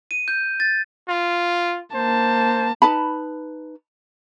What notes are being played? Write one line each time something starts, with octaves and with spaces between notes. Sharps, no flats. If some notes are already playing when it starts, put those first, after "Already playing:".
D#7
G6
A6
F4
A#3 C5 A5
D#4 B4 A5 B5